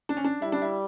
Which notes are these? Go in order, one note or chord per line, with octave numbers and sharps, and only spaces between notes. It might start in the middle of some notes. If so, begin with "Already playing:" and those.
D4
C#4
D4
G3 E4
D4
E4